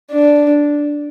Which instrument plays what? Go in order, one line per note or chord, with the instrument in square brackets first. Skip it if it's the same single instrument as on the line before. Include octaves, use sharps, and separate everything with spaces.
[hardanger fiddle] D4